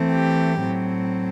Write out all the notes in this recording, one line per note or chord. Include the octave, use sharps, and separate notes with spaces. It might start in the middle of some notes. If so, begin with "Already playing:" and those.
Already playing: E3 A3 C4
G4
A2 F#3 C4